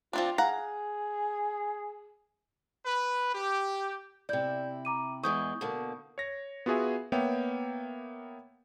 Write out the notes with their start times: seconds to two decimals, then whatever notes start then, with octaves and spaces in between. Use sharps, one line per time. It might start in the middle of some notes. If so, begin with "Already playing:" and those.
0.13 F3 C4 D4 F4
0.38 G#4 F5 F#5 A#5
2.85 B4
3.33 G4
4.29 C3 E4 D5 G6
4.85 A#5 D6 D#7
5.23 E2 E3 G#3 C#6 D#6 G6
5.61 B2 D3 A#3
6.18 C#5 A#6
6.66 B3 F4 F#4 G#4 E5 G#5
7.12 A#3 B3 C#5 E5 G5